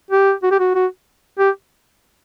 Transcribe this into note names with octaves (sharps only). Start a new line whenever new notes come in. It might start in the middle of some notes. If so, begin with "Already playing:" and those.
G4
F#4
G4
F#4
F#4
G4